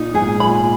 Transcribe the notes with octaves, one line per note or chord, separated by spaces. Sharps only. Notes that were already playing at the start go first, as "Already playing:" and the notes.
Already playing: A#2 D#4
G#2 G#4
A#2 B5